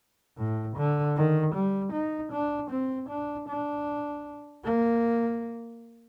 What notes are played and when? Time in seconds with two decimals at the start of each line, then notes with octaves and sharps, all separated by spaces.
0.38 A2
0.77 D3
1.16 D#3
1.55 G3
1.93 D#4
2.32 D4
2.70 C4
3.09 D4
3.48 D4
4.64 A#3